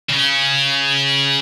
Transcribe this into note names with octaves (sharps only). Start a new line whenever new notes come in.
C#3 C#4